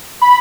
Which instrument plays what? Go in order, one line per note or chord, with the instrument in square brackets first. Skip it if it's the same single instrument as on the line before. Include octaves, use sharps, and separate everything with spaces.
[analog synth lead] B5